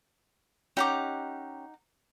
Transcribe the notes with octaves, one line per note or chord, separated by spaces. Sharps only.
C#4 D#4 G4 F#5 A#5 D6